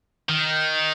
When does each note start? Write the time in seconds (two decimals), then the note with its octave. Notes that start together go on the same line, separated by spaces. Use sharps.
0.29 D#3